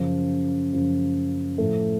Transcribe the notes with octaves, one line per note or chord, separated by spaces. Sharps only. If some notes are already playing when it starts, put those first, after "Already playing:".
Already playing: F#2 C#3 F3
F#2 C#3 F3
A2 F3 A3